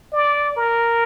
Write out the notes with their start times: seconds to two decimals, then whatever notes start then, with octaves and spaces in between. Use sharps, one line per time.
0.13 D5
0.57 A#4